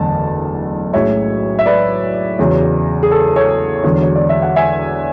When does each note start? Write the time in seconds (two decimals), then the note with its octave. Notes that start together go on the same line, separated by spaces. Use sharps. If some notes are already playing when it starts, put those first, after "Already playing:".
Already playing: F#1 E2 D3 A3 A5
0.93 B1 A2 G#3 C#4 C#5 E5
1.59 E5
1.66 B4 D5
2.39 E2 C#3 F#3
3.03 G#4
3.11 A4
3.36 A4 C#5
3.84 E1 E2 D3 F#3
4.02 C#5
4.16 D5
4.29 E5
4.42 F#5
4.56 E5 G#5